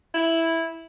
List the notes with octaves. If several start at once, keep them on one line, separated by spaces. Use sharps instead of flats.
E4